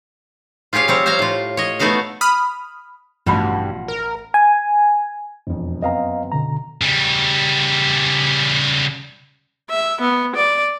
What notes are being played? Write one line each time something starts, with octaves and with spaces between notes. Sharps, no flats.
F4 G4 G#4 C#5 F5
G3 C4 C#5
C5 C#5 F5 A#5
A2 F4
C#5 D#5
A3 B3 D#4 F#4 F5
B5 D#6 F6
A1 G2 B2 F3 F#4 B5
A#4
G#5
E1 F2
F#2 B3 C4 D#5 F5 A#5
B2 D3 A#5
C#3 G3
E5
B3
D5